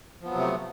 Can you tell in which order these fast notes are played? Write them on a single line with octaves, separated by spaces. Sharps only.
F3 B3 F#3 C3 A3